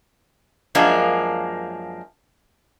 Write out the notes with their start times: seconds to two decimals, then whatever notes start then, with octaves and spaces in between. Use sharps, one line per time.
0.75 F#2 F3 G#3 A#3 D4